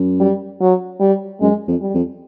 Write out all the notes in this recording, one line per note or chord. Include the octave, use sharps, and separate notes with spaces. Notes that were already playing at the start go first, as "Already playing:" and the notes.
Already playing: F#2
G3
F#3
G3
F#2 G#3
F2
G3
F2